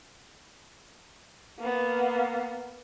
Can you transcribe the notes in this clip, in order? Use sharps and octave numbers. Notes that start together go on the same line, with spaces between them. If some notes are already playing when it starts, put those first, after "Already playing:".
A#3 B3